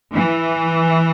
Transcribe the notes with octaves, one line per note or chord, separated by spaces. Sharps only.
E3